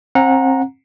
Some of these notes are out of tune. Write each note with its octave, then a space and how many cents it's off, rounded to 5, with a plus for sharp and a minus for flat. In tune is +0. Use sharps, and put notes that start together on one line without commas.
C4 +30 F#5 -25 A#5 +0